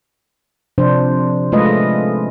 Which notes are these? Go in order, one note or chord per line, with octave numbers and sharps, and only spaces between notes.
C3 F3 D4 C5
G#3 A3 F4 B4 D#5